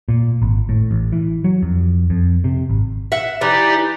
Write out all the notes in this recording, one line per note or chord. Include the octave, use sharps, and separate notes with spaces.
A#2
G#1
A2
A1
E3
F#3
F2
F2
C3
G#1
E5 F#5
E3 D#4 G4 D5